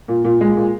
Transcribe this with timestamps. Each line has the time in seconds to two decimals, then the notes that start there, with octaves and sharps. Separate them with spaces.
0.08 A#2
0.25 A#2
0.41 G#3
0.57 A#2